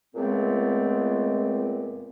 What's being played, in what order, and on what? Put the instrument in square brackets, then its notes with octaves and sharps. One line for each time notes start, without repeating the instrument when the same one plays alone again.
[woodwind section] C#2 A#2 G#3 A3 B3 C4